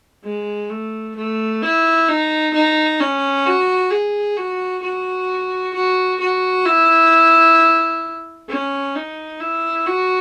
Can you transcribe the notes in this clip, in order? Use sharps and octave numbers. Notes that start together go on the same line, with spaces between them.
G#3
A3
A3
E4
D#4
D#4
C#4
F#4
G#4
F#4
F#4
F#4
F#4
E4
C#4
D#4
E4
F#4